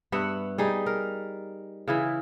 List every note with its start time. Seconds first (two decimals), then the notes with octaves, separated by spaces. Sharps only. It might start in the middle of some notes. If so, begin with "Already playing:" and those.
0.12 G2 B3 E5 F#5
0.58 G3 D#4 G#4
0.86 A#4
1.88 C#3 E3 E4